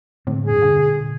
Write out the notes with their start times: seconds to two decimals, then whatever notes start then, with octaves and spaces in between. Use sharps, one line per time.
0.27 A2 D3 A3 C4
0.44 E1 G2 A#2 G#4
0.62 D3
0.88 A#2